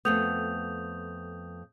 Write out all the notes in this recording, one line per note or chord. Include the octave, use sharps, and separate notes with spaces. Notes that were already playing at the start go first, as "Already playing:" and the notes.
F2 A3 B3 D#6 G6 F7